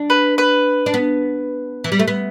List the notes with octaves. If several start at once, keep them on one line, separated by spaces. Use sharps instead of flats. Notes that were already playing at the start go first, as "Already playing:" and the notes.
Already playing: D4
B4
B4
D4
B3
E3
G3
A3
B3